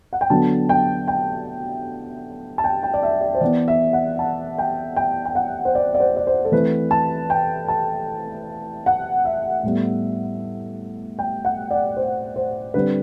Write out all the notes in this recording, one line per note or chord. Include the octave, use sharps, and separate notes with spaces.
F#5
G5
D3 F#3 B3 A5
G5
G5
A5
G5
G5
D5
E5
D5
C5
E3 B3 D5
E5
F#5
A5
G5
G5
G5
F#5
C5
D5
D5
C5
D5
C5
A4
E3 A3 C4 B4
A5
G5
A5
F#5
E5
A2 G3 B3
G5
F#5
D5
C5
C5
D3 G3 C4 B4